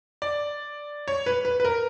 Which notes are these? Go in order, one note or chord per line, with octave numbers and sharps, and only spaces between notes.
D5
C#5
B4
B4
B4
A#4